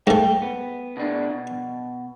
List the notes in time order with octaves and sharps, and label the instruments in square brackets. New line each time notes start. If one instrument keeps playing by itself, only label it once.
[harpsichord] G#2 A3 [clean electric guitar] G5
[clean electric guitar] B3
B2 D4
B2